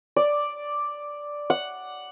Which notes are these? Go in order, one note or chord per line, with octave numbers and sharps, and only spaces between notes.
D5
F#5